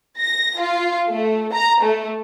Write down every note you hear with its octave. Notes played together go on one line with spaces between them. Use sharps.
A#6
F4
A3
A#5
A3